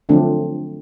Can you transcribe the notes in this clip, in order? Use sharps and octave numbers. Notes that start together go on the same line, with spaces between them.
D3 F3 F#3 A3 C4 D4